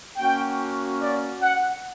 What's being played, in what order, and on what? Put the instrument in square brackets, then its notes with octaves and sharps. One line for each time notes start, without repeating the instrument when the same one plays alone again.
[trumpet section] A#3 C#4 F#4 G5
D5
F#5